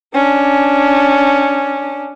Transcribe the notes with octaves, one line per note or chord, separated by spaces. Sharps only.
C#4 D4